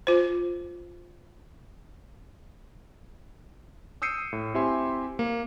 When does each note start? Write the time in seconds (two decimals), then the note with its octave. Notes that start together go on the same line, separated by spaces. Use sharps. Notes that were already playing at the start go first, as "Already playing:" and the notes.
0.07 F4 C5
4.02 D#6 E6 G6 C7 C#7 D#7
4.33 A2
4.54 C4 E4 G4 E5 G#5 C6
5.19 A#3